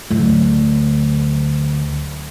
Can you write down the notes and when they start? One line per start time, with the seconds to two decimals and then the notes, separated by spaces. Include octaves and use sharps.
0.10 D2 F#3